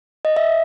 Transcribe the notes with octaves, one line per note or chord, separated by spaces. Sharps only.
D#5
E5